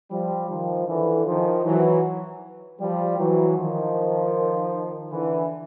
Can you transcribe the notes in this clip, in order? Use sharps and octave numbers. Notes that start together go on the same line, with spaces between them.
F3 G3
D#3 F3
D3 E3
D#3 F3
E3 F#3
F3 G3
E3 F#3
D#3 F3
D3 E3